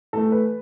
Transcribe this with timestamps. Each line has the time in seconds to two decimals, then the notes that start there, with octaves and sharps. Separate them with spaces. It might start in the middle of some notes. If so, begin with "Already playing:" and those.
0.13 A2 E3 A3 A4
0.32 B4